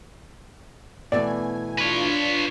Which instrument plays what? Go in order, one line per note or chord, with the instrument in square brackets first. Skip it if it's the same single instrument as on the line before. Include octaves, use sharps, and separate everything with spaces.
[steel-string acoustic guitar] B2 E3 A3 [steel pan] D5 [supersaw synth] G#5
[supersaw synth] D4 F4 [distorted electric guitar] B4 C#5